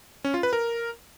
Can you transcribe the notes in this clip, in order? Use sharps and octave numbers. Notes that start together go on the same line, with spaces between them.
C#4
F4
B4
A#4